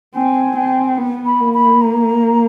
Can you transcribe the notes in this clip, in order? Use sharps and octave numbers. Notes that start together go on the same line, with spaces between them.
C4 G#5
C4
B3
B5
A#3
B5
A#5